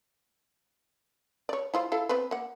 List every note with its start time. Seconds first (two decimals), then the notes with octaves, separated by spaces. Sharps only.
1.49 C#5 D5
1.74 E4 F4 C5
1.92 E4 A4 F5
2.09 B3 C4 B4
2.31 A#3 F#5